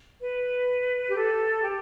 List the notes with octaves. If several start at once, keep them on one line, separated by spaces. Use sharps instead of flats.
B4
G4
A4
G4